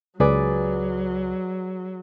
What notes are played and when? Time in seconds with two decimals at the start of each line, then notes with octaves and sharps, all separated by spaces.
0.20 C#2 F#3 G#4 B4 D5